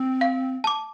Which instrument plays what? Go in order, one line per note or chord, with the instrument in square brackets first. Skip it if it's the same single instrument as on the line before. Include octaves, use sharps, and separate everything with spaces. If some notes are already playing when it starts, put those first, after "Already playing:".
Already playing: [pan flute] C4
[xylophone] F5
A5 D6